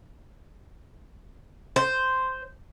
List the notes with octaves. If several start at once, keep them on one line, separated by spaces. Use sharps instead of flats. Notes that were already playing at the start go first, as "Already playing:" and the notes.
C5